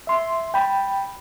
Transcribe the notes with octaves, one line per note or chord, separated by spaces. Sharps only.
E5 C6
G5 B5